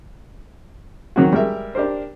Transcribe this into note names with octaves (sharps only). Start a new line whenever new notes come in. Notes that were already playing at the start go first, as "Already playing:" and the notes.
D#3 F#3 C4 F#4
G3 G#3 A#4 E5
D4 G4 A#4 C5